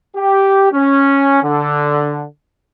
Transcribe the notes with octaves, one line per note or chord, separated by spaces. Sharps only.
G4
C#4
D3